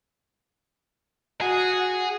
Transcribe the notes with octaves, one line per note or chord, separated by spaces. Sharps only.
F#4 G#4